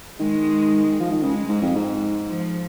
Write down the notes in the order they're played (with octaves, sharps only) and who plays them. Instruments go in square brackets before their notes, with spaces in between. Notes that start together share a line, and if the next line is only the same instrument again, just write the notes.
[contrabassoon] D#3 [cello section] G#3
[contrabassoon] F3
D#3
[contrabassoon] C#3 [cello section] G#3
[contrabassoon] G#2
F2
G#2
[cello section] F3